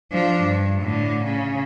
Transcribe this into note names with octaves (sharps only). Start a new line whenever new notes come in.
F3 D4
G2
A2 D3
C#3